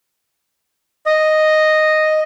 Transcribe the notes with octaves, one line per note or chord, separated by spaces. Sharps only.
D#5